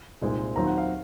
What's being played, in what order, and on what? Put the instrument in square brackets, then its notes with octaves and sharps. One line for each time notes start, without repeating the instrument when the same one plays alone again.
[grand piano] C2 A#2 G#3 C4 D#4
D#2 D#3 F#3 C4 F4 A#5
F#5
F5